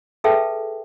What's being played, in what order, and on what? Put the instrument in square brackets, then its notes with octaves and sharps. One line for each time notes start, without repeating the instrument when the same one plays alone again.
[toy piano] G#4 A4 B4 E5 G5 A5